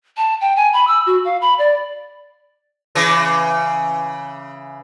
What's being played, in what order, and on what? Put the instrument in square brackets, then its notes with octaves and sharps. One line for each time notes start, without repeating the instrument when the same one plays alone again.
[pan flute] A5
G5
G#5
B5
E6
F#4
F5
B5
D5
[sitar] C#3 E3